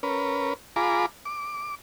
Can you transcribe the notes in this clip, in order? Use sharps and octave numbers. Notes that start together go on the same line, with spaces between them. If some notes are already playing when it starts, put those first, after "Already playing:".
C#4 A#4 B4
F4 G#4 A#5 B5 D6
D6